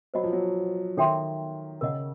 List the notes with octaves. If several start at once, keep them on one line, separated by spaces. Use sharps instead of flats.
F#3 C5 D#5 F#5 B5
F3
F#3
D#3 A4 C#5 E5 G5 C6
C#3 A#4 D#5 F#5